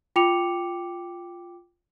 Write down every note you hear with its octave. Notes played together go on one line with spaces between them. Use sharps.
F4 G5 D6 C#7 F7